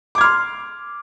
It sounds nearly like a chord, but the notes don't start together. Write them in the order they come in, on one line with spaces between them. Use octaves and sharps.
D6 G#6 F6 C6